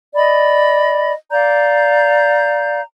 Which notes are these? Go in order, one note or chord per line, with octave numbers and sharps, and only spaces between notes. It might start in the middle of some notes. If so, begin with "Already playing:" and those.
D5 D#5 B5
D5 F5 A#5 G6